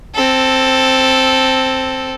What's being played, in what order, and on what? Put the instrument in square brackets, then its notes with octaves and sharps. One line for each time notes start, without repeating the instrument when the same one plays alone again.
[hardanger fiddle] C4 A4